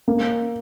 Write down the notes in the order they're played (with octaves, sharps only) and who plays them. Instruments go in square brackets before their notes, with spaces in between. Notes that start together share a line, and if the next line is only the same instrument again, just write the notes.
[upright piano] A#3